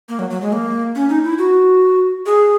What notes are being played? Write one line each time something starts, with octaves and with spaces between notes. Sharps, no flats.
A#3
F#3
F#3
G#3
A#3
C#4
D#4
E4
F#4
G#4